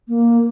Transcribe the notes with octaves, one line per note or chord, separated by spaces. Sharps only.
A#3